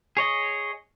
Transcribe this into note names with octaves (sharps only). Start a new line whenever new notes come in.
G#4 C#5 D#5